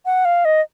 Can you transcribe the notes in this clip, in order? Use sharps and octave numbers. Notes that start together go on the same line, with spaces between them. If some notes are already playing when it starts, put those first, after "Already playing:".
F#5
F5
D#5